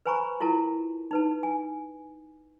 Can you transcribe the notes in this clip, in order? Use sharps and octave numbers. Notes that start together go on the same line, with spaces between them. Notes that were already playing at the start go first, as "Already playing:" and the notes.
B4 C5 G#5 A#5 B5 C#6
E4 F4 A#4 A5
D#4 B4 A5
G#5